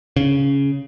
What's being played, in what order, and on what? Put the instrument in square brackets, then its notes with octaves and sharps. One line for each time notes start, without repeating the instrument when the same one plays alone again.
[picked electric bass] C#3